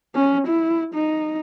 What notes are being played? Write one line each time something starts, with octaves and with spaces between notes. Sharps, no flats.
C#4
E4
D#4